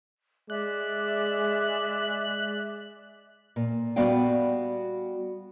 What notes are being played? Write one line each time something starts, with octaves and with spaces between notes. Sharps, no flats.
G#3 D5 E5 D6 F#6
A#2
G3 B3 F#4 D5 F5 G5